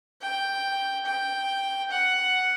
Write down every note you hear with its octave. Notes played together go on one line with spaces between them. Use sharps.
G5
G5
F#5